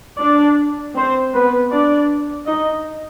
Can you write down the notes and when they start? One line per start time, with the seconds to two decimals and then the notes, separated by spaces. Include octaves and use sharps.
0.20 D4 D5
0.95 C4 C5
1.34 B3 B4
1.71 D4 D5
2.47 D#4 D#5